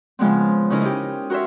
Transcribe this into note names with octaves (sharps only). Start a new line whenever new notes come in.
C#3 F3 G#3 B3 C4
C#3 C#4 D#4 E4 A#4
D#4 G4
F#4 A#4 C5 C#5 E5